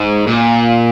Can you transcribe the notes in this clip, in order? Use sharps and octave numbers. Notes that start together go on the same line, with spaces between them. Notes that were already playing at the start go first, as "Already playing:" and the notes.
Already playing: G#2
A#2